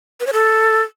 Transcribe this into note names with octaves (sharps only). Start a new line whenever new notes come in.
B4
C#5
A4